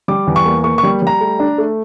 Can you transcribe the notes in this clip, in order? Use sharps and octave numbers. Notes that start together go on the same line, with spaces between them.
G3 D6
E2
C#6
A#3
A#3 C#6
C#6
G3
G3 A#5
A3
D4
A3